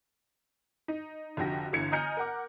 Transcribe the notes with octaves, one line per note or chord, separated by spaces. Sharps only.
D#4
F1 D3 F3 F#4 G4 A#6
G1 D3 E3 G#6 C#7
D#5 G#5 A#5 F6 G6 C#7
A#4 F#5 D6